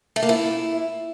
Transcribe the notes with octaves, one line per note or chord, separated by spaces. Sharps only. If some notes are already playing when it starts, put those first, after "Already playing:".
A3
A#3
E4